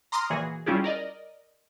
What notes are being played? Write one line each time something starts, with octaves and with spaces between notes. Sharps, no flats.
A#5 C6 D6 D#6 F6 A#6
A#2 E3 F#4 G#4
G3 C#4 E4 F4 G4 G#4
A#4 D5 D#5